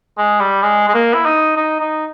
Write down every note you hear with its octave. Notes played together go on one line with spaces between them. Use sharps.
G#3
G3
G#3
G#3
A#3
E4
D#4
D#4
D#4